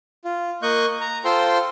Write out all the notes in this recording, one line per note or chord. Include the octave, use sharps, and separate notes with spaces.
F4
A#3 D#5 C#6 F#6 G6
A#5
F4 A4 C5 G5 C6